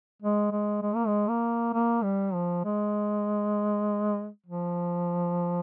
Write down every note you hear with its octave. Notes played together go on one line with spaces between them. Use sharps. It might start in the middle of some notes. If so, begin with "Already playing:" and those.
G#3
G#3
G#3
A#3
G#3
A#3
A#3
G3
F3
G#3
F3